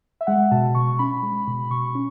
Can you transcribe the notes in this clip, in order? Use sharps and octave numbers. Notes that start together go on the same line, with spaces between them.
E5
G#3 F#5
B2 A5
B2 C#6
C#4 B5
G#3
B2
B2 C#6
C#4